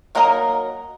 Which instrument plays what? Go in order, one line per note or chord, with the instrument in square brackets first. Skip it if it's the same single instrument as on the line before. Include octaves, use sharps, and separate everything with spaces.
[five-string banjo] F#3 A#3 D#4 A#4 D#5